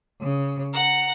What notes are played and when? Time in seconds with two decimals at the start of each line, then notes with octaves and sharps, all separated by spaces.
0.21 C#3
0.73 F#5 A#5